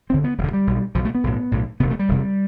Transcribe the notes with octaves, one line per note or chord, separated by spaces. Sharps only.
E1 D2 D3 C4
B3
E1 D2 D3 G3
G3
B1 B2
B1 F3
B2 A3
B3
B1 A2
B1 A2
E1 D2 C3 B3
A3
G3
E1 D2 C3